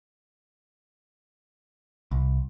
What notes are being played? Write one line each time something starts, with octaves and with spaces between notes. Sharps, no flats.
C2